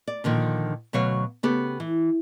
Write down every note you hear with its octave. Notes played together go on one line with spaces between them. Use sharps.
D5
A#2 D3 D#3 F3
D2 B2 F#3 C#5 F5
C#3 B3 G4 A4
E3